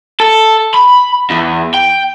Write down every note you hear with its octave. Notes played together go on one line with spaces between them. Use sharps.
A4
B5
E2
G5